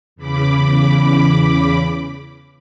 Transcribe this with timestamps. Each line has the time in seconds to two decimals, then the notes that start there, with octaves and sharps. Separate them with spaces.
0.16 E2 C#3 B5 D6